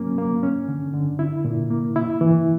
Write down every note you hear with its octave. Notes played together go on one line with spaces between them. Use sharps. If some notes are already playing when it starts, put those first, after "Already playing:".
Already playing: F#3 A#3 C#4
A#3
C#4
D3
D3
E4
A#2
A#3
E4
E3